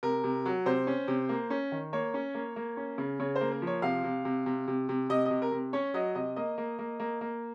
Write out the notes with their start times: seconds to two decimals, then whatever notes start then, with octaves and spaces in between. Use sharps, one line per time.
0.03 C3 A#4
0.24 C3
0.45 F#3
0.66 C3 C5
0.87 C#4
1.08 C3
1.29 A#3
1.50 C#4
1.72 D#3
1.93 A#3 C#5
2.14 C#4
2.34 A#3
2.56 A#3
2.77 C#4
2.98 C#3
3.20 C#3 C#5
3.36 C5
3.41 A#3
3.51 A#4
3.62 F3
3.67 C#5
3.82 C3 F5
4.04 C3
4.25 C3
4.46 C3
4.67 C3
4.89 C3
5.09 C3 D#5
5.26 C3 D#5
5.42 A#4
5.51 C3
5.73 C#4 C#5
5.94 F#3 D#5
6.15 C3 D#5
6.36 A#3 D#5
6.58 A#3
6.79 A#3
7.00 A#3
7.21 A#3